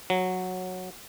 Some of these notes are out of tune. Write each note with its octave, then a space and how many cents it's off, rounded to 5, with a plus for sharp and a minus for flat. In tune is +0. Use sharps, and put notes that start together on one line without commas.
F#3 -10